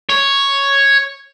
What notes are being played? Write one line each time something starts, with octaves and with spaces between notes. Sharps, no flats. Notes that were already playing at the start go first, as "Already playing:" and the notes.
C#5